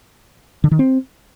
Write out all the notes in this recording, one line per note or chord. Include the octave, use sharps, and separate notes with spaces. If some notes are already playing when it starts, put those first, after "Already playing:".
D3
D#3
C4